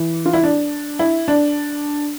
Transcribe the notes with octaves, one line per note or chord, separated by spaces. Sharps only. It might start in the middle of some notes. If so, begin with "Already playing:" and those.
Already playing: E3
F4
E4
D4
E4
D4